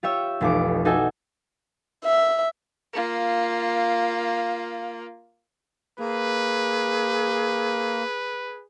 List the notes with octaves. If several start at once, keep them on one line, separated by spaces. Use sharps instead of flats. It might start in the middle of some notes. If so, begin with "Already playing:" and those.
F4 G4 C#5 E5
F1 B1 F2 E3 D6
D#4 F#4 A4 E5 G#5
E5
A#3 F4
A#3 G#4 B4